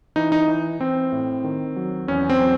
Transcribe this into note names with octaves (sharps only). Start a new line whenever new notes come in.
E3 D#4
D#4
E3
E3 C4
A2
D#3
F#3
E2 C#4
C4
F#3